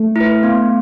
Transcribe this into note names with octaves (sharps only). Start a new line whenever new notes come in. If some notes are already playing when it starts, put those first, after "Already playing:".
Already playing: A3
E4 B4
B3